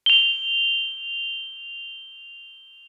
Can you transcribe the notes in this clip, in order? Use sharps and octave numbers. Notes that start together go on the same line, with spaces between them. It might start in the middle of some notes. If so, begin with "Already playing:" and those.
F7 G7